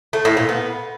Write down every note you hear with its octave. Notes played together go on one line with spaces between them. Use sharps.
A3
A2
A#2
B3